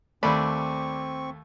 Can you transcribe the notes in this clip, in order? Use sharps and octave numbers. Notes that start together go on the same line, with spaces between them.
D#2 A3 C4 D4 B5 C#6